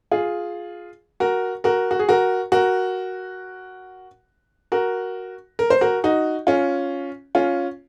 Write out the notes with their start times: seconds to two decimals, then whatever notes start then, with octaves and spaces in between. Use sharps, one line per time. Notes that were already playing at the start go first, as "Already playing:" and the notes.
0.12 F4 G#4
1.20 F#4 A#4
1.64 F#4 A#4
1.91 F#4
1.99 G#4
2.09 F#4 A#4
2.52 F#4 A#4
4.72 F#4 A#4
5.59 A#4
5.70 C5
5.81 F#4 A#4
6.04 D#4 F#4
6.47 C#4 F4
7.35 C#4 F4